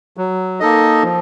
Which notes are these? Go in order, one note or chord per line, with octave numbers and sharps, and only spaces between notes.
F#3
A#3 D#4 A4 D#5
F3